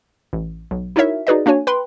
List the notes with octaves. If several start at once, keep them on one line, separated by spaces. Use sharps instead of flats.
A1
B1
D#4 E4 F#4 A#4 C#5 E5
D#4 F#4 G#4 B4 D5 D#5
A#3 D4 F#4 C#5 G#5
B4 G5 B5 C6